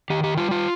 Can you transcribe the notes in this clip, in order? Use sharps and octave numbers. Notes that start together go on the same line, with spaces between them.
D#3 G4
G4
G3 F4
F4